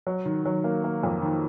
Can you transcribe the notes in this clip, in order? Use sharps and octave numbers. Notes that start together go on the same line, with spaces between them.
F#3
D#3
F#3
A#3
A#3
F2
D#3